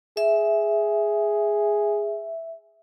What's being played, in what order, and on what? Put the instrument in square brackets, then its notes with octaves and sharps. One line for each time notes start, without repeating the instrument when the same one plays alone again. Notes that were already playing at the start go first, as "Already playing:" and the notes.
[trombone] G#4 [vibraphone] E5